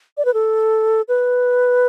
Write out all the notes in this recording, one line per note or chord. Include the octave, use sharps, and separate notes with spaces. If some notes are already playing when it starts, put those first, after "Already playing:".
D5
B4
A4
B4